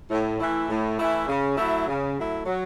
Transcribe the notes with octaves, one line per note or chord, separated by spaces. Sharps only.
A2
E3 A3 E4
A2
E3 A3 E4
C#3
F#3 A3 E4
C#3
F#3 A3 E4
F#3